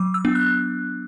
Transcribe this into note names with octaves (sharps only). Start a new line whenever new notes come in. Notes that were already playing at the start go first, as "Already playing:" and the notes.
Already playing: F#3 D6
E6
B3 D4
F#6